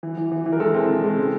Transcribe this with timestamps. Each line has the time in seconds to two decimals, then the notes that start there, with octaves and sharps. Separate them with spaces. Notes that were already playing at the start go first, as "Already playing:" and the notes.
0.03 E3
0.18 E3
0.32 E3
0.46 E3
0.52 A#4
0.60 G#3 A4
0.74 C4
0.89 E3
1.04 G#3
1.18 C#3